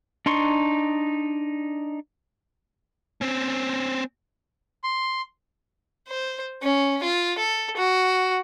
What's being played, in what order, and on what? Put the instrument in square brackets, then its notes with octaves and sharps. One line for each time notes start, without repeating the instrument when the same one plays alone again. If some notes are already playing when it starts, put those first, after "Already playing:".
[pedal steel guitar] D4 D#4 C6 C#6
[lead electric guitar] C4 C#4
[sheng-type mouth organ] C6
[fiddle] C5
C#4
F4
A4
F#4